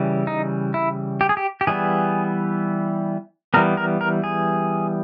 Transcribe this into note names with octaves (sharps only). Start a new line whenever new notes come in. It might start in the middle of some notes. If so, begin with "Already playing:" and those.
Already playing: C#3 E3 G3
D#4
E4
G4
G#4
G4
G4
E3 G3 B3 G#4
E3 G3 B3 A#4
A#4
A#4
G#4